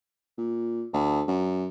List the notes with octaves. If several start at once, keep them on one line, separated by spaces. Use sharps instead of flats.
A#2
D2
F#2